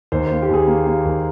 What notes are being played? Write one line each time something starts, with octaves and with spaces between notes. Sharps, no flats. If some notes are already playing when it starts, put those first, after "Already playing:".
D#2 C5
C5
A#3
G4
D#2 G#4
A#3
A#3
D#2